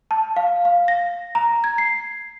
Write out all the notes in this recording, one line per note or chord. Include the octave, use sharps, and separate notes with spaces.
A5
F5
F5
A#6
A#5
G#6
C7